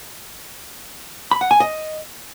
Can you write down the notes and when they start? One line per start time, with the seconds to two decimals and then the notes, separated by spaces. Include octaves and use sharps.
1.31 B5
1.41 F#5
1.51 G#5
1.60 D#5